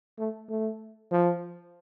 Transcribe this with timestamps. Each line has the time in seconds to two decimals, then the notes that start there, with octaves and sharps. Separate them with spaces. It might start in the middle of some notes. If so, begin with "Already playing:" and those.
0.18 A3
0.49 A3
1.11 F3